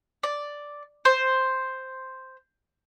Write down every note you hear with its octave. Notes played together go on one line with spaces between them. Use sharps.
D5
C5